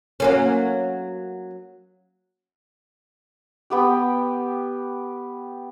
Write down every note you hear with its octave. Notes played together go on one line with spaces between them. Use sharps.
F#3 A#3 C#4
B3 G4 G5